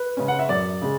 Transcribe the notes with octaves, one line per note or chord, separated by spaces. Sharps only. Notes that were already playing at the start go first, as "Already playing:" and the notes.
Already playing: B4
C#3 G#3 C#4
F#5
E5
F#2 D5
C#3 G#3